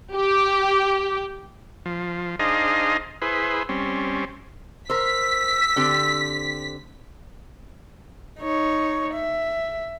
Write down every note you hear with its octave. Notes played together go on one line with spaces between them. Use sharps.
G4
F3
D4 D#4 G#4 C5 D#5 F5
E4 G#4 B4 C5
G3 C4 C#4
A#4 C5 E6 B6
D3 C4 G4
D#4 C#5
E5